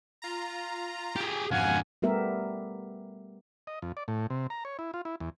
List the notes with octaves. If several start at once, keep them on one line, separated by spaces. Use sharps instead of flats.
F4 A#5
G4 G#4
F2 G#2 F5 F#5 G#5
G3 A3 B3 G4 A#4 E5
D#5
F2
D5
A2
C3
A#5
C#5
E4
F4
E4
E2